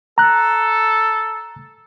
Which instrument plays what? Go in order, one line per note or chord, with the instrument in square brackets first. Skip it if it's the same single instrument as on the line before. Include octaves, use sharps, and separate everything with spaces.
[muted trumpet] A4 [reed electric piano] A#5 F#6